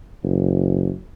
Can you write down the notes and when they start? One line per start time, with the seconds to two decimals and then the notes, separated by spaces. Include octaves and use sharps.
0.23 F#1